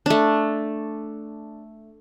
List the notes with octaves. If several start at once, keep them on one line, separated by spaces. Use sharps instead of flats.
A3 D4